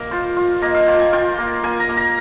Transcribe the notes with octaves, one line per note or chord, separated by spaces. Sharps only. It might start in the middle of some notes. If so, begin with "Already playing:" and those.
Already playing: A#3 A#4
F4 C5
F4
A#3 D#5
F5
F4 G5
G#5
F4 G5
A#3
A#3 G#5
A#5
A#3
A#5